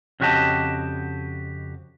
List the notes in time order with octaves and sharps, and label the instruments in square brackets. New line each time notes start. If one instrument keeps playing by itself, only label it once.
[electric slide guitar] F2 C#3 F#4 G4 D#5 A5